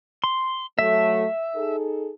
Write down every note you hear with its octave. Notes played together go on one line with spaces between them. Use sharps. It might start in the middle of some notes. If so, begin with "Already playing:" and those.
C6
F#3 A3 E5
D#4 G#4 A4